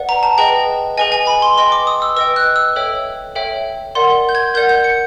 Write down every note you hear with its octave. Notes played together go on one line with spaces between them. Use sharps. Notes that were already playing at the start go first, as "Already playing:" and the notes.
Already playing: B4 D5 F#5
A#5
A5
G#4 B4 D#5 G5
G#4 B4 D#5 G#5
G#5
B5
C6
B4 D#5 G5 C6
D6
D#6
E6
B4 D#5 G5 E6
F#6
E6
A4 C#5 E5 G5
A4 C#5 E5 G5
A#4 D5 F#5 C6
G6
G#6
A#4 D5 F#5 G6
G6
C#7